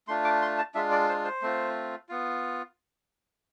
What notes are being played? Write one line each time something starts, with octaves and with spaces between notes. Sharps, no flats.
A3 D4 F4 C6
D6
C6
A5
G#3 D4 F4 E5
D5
C5
C5
A3 C4 F4
B3 F4